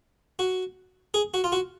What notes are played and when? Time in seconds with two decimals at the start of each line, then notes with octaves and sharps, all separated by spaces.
0.39 F#4
1.14 G#4
1.34 F#4
1.44 F4
1.52 F#4